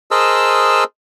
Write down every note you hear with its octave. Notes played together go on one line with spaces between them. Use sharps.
G#4 A#4 C5 D#5 A5 E6